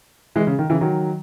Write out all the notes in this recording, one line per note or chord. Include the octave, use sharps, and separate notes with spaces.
E3 G#3
C#3
D#3
C#3 E3
D#3 F#3